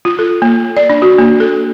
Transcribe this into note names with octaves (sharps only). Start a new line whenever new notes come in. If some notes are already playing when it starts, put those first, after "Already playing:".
F4
A4
A#3
D5
D4
F#4
A#3
A4